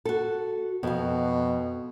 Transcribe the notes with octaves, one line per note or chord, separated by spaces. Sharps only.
F#4 A4
F2 B2 F5